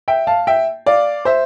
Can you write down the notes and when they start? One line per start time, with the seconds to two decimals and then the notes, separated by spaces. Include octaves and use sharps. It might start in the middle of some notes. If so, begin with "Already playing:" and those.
0.08 E5 G5
0.27 F5 A5
0.47 E5 G5
0.86 D5 F5
1.25 C5 E5